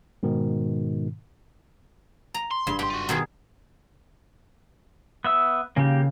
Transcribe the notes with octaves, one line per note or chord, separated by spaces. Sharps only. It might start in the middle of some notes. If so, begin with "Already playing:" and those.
G#2 B2 D#3
A#5
C6
F#1 G2
B2 G4 C6
F4 F#4
B2 D#3 G#4
B3 E5 E6
C#3 A#3 G4